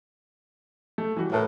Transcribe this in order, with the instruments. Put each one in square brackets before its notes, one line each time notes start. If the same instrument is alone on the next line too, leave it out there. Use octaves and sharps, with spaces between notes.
[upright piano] A3
E3 G3 F#4
[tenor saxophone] A2 [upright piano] A#4 B4 A5